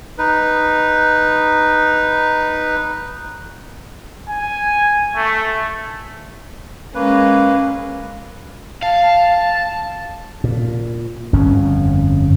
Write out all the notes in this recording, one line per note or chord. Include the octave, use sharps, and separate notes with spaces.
D#4 B4
G#5
A3
G#3 A#3 C#4 B4
F5 A5
A5
A#2
G1 F2 C#4